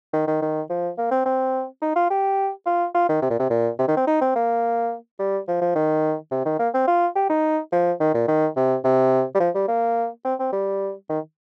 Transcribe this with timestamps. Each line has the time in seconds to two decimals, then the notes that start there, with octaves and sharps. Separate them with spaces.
0.13 D#3
0.27 D#3
0.42 D#3
0.70 F3
0.98 A#3
1.11 C4
1.26 C4
1.82 D#4
1.96 F4
2.10 G4
2.66 F4
2.94 F4
3.09 D#3
3.22 C3
3.30 A#2
3.39 C3
3.50 A#2
3.79 C3
3.88 D#3
3.97 C4
4.07 D#4
4.21 C4
4.35 A#3
5.19 G3
5.48 F3
5.61 F3
5.75 D#3
6.31 C3
6.46 D#3
6.59 A#3
6.74 C4
6.87 F4
7.15 G4
7.29 D#4
7.72 F3
8.00 D#3
8.14 A#2
8.28 D#3
8.56 C3
8.84 C3
9.34 G3
9.40 F3
9.55 G3
9.68 A#3
10.25 C4
10.39 C4
10.53 G3
11.09 D#3